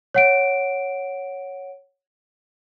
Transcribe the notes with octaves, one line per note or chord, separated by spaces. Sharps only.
C#5 F#5 D7